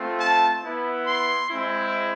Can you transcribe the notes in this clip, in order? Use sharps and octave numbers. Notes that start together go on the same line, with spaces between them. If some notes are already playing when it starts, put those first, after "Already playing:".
Already playing: A3 C4 F4
A5
B3 E4
C6
G#3 C4 E4